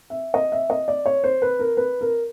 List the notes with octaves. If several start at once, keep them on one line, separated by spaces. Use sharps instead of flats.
E5
D#5
E5
D#5
D5
C#5
C5
B4
A#4
B4
A#4